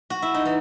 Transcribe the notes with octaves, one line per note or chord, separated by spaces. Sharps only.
F#4
E4
D#4
E3